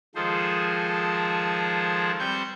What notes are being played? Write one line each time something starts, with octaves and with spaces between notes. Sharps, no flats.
D#3 F3 G#3 G#4 A4 C5
G3 C4 B4 C5 C#6 G6